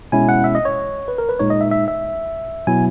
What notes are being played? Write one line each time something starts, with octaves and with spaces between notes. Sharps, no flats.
B2 G#3 C#4 E4 G#5
F#5
E5
D#5
C#5
B4
A#4
B4
A#2 G#3 D#4 C#5
D#5
E5
E5
E5
B2 F#3 B3 E4 G#5